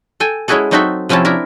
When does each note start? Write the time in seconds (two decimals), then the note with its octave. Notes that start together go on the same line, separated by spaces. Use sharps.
0.20 A4 G5 G#5
0.48 G#3 C#4 E4 F#4 G#4 A4
0.71 F#3 C4 D#4 F#4 A4 E5
1.09 C3 F3 C4 C#4 E4 A5
1.25 D4 E4 A#4